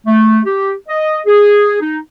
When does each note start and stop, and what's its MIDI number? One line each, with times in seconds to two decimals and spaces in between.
0.06 0.39 57
0.45 0.71 67
0.88 1.18 75
1.26 1.78 68
1.80 1.98 63